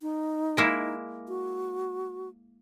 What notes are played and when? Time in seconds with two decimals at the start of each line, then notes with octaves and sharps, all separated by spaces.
0.01 D#4
0.57 G#3 A#3 E4
1.28 F#4